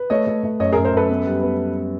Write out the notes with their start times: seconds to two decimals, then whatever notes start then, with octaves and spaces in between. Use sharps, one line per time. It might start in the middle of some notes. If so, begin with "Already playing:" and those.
Already playing: B4
0.10 A3 C#5 D#5
0.27 A3
0.44 A3
0.60 F#2 C#5 D#5
0.73 F#2 G#4 A#4
0.85 A#4 C5
0.93 F#2 A4 B4
1.09 B3
1.26 G3
1.43 B3